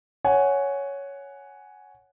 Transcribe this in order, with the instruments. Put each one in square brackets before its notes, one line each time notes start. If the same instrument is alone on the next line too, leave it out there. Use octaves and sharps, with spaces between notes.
[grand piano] C#5 F#5 G#5